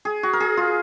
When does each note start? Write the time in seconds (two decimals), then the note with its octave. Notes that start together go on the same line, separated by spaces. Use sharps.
0.05 G#4
0.23 F#4
0.33 A#4
0.40 G#4
0.57 F4